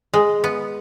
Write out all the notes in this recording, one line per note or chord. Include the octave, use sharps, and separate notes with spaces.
G#3
B3